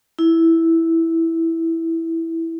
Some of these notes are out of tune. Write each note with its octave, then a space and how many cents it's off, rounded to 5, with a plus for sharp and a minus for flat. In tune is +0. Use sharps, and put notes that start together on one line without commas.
E4 -5